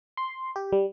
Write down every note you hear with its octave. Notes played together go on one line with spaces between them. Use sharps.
C6
G4
G3